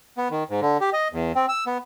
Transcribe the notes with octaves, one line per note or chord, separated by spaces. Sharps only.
B3
D#3
G#2
D3
G4
D#5
E2
C4
E6
B3